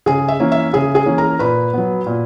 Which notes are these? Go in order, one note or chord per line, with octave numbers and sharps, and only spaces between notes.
C#3 G#4 G#5
E5
E3 A#3 C#4
E5
C#3 G#4 G#5
G#4 G#5
E3 A#3 C#4
A#4 A#5
A#2 B4 B5
F#3 B3
A#2